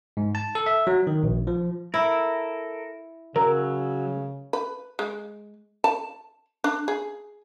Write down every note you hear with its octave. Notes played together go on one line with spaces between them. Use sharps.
G#2
A5
A4
E5
F#3
D#3
A#1
F3
E4 A4 A#4
C#3 F#3 A#4 E6
B4
G#3
A5
D4
G#4